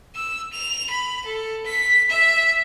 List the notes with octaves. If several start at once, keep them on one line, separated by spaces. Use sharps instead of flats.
E6
F7
B5
A4
B6
E5